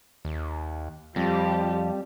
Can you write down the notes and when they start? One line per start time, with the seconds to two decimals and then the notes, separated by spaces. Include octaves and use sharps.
0.25 D#2
1.16 F2 F3 G3 G4